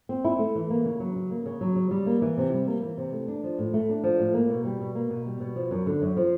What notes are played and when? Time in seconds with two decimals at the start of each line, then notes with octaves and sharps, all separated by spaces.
0.09 C4
0.24 E4
0.39 A3
0.55 E3
0.70 A#3
0.85 C#3
1.00 F#3
1.16 C#3
1.31 A#3
1.46 C#3
1.61 F#3
1.76 C#3
1.91 G3
2.06 A#3
2.22 E3
2.38 C3
2.53 G3
2.67 A#3
2.83 E3
2.98 C3
3.12 A3
3.28 D4
3.44 F3
3.59 A2
3.74 A3
3.89 D4
4.03 F3
4.20 A2
4.34 A#3
4.50 B2
4.65 G3
4.81 B2
4.95 A#3
5.10 B2
5.26 G3
5.40 B2
5.56 F3
5.71 F#2
5.86 D3
6.01 F#2
6.17 F3